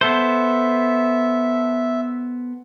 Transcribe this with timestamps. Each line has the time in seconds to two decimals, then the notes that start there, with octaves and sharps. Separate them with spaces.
0.01 B3 A4 C5 E5